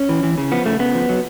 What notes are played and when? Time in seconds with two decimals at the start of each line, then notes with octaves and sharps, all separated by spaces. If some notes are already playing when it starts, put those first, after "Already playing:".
Already playing: C#4
0.09 E3
0.23 E3
0.38 C#3
0.51 F3 B3
0.66 C#3 A3
0.79 C#3 B3
0.94 F3
1.09 F#3